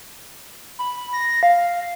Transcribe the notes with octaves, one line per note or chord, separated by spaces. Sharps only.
B5
A#6
F5